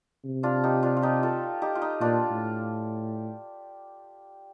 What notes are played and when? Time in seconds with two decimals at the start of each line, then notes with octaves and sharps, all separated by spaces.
0.25 C3
0.43 D4 F4
0.64 D#4 G4
0.83 D4 F4
0.97 F4
1.02 D#4 G4
1.23 F4 A4
1.62 D#4 G4
1.75 F4
1.82 D#4
2.01 A#2 D4 F4
2.31 A2